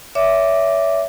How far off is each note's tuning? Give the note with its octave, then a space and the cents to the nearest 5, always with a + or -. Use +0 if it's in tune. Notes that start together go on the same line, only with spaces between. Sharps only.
C#5 +25 E5 +0 D6 +0